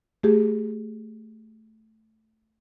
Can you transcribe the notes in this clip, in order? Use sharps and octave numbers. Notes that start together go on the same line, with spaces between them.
A3 G4 G#4